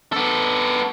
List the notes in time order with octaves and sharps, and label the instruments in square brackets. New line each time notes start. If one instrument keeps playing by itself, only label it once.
[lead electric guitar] B3 A4